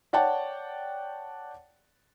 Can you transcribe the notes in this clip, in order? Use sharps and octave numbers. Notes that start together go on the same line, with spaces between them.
C#5 D5 F#5 G5 A5